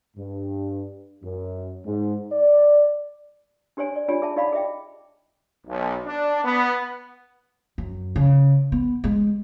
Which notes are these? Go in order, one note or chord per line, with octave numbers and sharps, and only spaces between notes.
G2
F#2
G#2
D5
D4 G4 C5 C#5 G#5
D5
D4 F4 G4 C#5 G#5
G#4 E5 A5
D#4 G4 D5 F5 F#5 B5
G#4 D#5 E5 G5
B1
D4
B3
F#2
C#3
B3
G#3